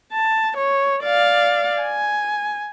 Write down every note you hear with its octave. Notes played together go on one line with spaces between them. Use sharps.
A5
C#5
D5 F5
G#5